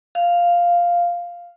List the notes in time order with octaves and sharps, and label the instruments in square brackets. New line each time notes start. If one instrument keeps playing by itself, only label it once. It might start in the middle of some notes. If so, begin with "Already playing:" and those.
[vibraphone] F5